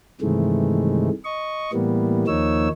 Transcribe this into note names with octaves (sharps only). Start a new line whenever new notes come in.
G2 C3 D#3 E3 G#3 A3
D#5 C#6
A2 E3 G3 A#3 B3
D#2 F3 A#3 D#4 C#5 E6